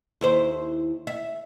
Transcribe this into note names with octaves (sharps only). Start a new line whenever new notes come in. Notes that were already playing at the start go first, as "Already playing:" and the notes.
D#2 E4 C5
E5